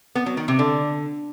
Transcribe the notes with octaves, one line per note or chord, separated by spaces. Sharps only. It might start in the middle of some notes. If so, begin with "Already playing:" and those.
B3
F#3
D#3
C3
D3